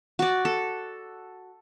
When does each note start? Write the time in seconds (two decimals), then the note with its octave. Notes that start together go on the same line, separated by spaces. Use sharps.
0.19 F#4 D5
0.45 A4